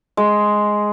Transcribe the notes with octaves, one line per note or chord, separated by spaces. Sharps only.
G#3